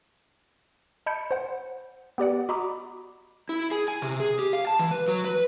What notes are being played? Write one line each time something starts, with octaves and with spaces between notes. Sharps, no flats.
D#5 A5 B5 G6 C#7
C5 F#5
B3 G4 D5 F#5
F#4 D#5 A#5 B5 D6 D#6
E4
G#4
G#5
C3
G#4
G4
F5
A5
E3
B4
F#3
B4